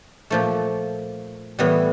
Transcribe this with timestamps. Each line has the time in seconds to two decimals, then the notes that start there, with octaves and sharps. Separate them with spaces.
0.30 A#2 F3 A3
1.59 A2 E3 G3 B3